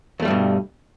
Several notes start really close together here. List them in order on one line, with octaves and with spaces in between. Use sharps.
E2 A3 G3 G2 B2